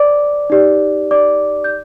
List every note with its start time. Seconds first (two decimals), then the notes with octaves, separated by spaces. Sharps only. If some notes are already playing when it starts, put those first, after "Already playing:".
Already playing: C5 D5 D6
0.50 D#4 G4 D5
1.11 D5 D6
1.64 G6